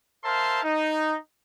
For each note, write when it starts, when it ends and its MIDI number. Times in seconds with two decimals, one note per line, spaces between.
0.24 0.61 70
0.24 0.61 72
0.24 0.61 76
0.24 0.61 77
0.24 0.61 81
0.24 0.61 84
0.63 1.16 63